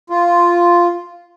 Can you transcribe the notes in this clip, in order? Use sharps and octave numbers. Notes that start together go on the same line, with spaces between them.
F4